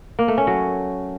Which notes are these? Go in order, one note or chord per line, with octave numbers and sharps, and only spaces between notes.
A#3
A3
C#4
F#3